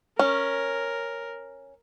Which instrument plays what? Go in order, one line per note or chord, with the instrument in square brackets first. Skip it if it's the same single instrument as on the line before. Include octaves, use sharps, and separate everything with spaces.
[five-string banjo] C#4 [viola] A#4